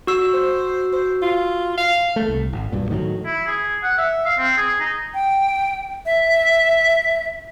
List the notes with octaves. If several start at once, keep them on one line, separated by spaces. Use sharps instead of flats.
F#4 E6
C5
C5
F4
F5
A3
C2
G#1
B1 G2 A#2
A2 D#3 F3 F#3
E4
G#4
F#5
E5
F5
C4
G#4
D#4
G5
E5